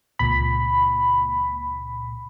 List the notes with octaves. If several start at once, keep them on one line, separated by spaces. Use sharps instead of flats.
C#2 A#2 B5